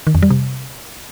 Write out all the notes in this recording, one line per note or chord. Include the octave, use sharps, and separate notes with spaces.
D#3
F2
G3
C3